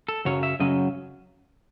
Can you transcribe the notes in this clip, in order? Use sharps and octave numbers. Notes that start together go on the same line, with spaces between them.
A4
F#2 C#3 F#3 C#4 C#5
E5
F#2 C#3 F#3 C#4 D#5